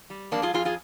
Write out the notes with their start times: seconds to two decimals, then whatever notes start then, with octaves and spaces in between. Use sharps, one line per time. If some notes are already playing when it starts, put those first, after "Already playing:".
0.10 G3
0.31 F2 A#3 D4
0.42 F4 G#4
0.54 F2 F4 G#4
0.65 F4 G#4